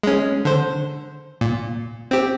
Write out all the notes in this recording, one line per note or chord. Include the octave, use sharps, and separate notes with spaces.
G#3 C#4
D3 C5
A#2
C4 G4